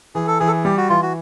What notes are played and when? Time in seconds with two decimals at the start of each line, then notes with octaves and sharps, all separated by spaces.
0.15 E3 G#4
0.27 A4
0.39 E3 G#4
0.48 A4
0.52 G#4
0.65 G3 G4
0.77 F#4
0.89 E3 F4
1.02 F#4